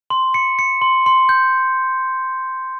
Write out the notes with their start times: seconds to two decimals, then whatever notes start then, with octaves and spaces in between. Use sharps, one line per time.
0.10 C6
0.34 C#7
0.59 C#7
0.82 C6
1.06 C6
1.29 G6